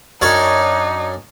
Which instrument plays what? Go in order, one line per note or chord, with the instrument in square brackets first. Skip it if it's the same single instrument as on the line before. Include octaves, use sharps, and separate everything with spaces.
[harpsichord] F#2 D4 C#5 [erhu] D#4